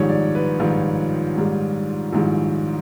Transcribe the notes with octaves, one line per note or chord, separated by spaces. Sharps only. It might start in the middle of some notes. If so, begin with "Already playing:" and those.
Already playing: A#1 G#2 D#3 G3 C#5
D5
B4
A#1 G#2 D#3 G3 F4
A#1 G#2 D#3 G3
A#1 G#2 D#3 G3 E4